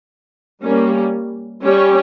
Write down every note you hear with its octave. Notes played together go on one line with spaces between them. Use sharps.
G3 A#3 C#4
G3 C#4 G4 C#5